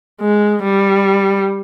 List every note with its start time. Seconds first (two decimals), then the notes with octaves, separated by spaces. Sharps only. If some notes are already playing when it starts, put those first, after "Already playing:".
0.21 G#3
0.63 G3